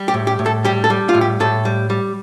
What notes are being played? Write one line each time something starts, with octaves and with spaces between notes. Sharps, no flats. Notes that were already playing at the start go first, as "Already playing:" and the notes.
Already playing: G3
G4
A2
G4
A2
A4
G3 G4
A4
G3
F4
A2
G4
A2 A4
G3
G3